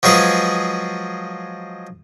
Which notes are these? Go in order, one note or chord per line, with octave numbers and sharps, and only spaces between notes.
F3 F#3 G#3 G#4 B4